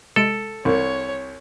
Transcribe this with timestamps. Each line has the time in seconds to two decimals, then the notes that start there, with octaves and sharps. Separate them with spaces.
0.16 C3 G#3 A4 D7
0.65 C2 C#5